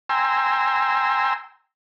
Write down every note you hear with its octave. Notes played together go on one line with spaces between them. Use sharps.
G5 G#5 A#5 C6 E6